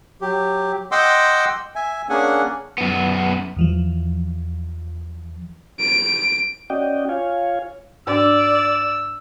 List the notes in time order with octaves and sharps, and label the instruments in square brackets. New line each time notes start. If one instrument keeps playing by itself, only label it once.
[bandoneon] F#3 G4
D#5 F#5 G5 C6 D6 E6
E5 G#5
A#3 C#4 D4 G#4 F#5 G#5
[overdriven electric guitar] F#2 B3
[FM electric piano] E2 E3 F3
[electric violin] D7
[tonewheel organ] C#4 F#4 D5 D#5 G5
F4 C#5 F5 G#5
[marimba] G#2 D4 [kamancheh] D5 [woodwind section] E6